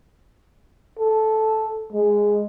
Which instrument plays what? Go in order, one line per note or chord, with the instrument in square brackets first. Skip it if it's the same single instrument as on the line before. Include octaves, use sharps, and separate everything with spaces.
[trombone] A4
G#3